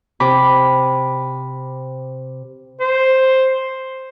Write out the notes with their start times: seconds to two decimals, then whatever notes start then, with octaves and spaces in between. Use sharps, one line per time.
0.20 C3 B5 D6
2.80 C5